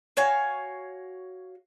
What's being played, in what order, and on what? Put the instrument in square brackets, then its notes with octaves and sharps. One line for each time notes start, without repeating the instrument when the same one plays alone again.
[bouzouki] F#4 C#5 F5 G#5